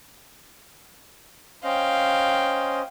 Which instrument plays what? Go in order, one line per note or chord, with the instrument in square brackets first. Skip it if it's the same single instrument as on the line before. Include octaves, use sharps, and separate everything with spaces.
[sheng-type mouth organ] C#4 C5 D#5 [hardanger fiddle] F5 G5